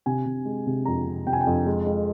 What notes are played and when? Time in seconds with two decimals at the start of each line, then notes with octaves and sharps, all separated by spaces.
0.06 C3 G#5
0.26 C3
0.45 G#3
0.67 C3
0.85 F2 A#5
1.06 C3
1.27 C3 G5
1.33 G#5
1.41 G5
1.47 F2
1.66 G#3
1.87 G#3